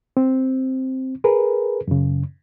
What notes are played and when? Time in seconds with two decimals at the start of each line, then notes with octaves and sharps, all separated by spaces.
0.17 C4
1.24 G#4 A#4 B4
1.88 F#2 C#3